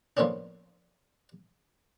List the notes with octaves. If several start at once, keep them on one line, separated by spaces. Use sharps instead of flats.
A2 F3 A#3 B3 C#4 D4